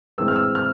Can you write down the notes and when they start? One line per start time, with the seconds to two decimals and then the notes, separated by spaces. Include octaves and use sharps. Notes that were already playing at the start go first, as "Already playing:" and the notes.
0.18 A2 E3 G#3 C4 E6
0.28 F6
0.36 E6
0.55 F6